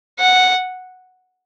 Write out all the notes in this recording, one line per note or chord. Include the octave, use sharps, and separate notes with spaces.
F#5